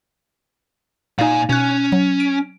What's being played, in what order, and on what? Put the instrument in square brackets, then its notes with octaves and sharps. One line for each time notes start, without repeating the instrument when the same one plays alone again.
[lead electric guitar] A#2 G#5 [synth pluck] D#4 F5
[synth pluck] B2 F#6 [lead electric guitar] C#4
[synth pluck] F#3
D7